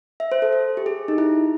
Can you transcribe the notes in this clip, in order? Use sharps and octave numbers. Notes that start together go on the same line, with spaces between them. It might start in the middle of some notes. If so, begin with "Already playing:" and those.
E5
C5
A4
A4
G4
G#4
D#4
E4